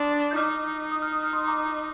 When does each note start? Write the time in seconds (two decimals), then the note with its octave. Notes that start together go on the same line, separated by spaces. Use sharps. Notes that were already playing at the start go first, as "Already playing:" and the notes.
Already playing: D4 C6 D#6
0.31 G6
0.35 D#4 D6 F6
0.92 D#6
1.02 F6
1.12 D#6
1.24 F6
1.33 C6 D#6
1.47 A#5 D6